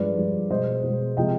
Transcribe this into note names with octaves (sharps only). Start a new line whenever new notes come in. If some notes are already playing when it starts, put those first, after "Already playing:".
Already playing: G2 F3 G#3 B4 D5
G2 F3 G#3
B2 G#3 C5 D#5
B2 G#3
C3 F3 G#3 D#5 G5